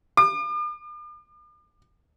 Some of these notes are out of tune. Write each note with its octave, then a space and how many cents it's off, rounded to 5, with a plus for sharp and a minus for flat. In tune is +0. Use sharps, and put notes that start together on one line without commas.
D6 +45